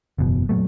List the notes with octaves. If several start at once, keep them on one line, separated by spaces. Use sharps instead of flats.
F#1 E2 B2
A#2 F#3 A3